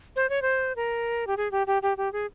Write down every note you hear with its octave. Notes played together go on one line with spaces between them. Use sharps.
C5
C#5
C5
A#4
G4
G#4
G4
G4
G4
G4
G#4